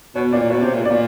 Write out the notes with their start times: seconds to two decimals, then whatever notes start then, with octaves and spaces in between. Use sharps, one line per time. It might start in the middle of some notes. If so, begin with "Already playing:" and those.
0.15 B2 C#5
0.32 A#2 D5
0.50 B2 C#5
0.62 C3
0.74 A#2
0.82 B2
0.85 A#2 D5